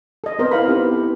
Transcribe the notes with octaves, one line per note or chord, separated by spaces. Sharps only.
A4 D#5
B3 C4 A#4 C5 D#5
E4 F5 B5
C4 D#4 G4 B4
E4 A4